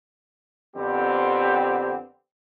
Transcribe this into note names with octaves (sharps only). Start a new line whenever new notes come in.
F2 D3 B3 C4 G4